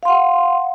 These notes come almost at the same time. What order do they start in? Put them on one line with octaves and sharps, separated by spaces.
F5 C6 F#5